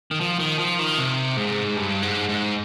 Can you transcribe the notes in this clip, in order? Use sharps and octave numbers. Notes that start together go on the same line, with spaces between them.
D#3
F3
D#3
F3
D#3
C3
G#2
G2
G#2
G#2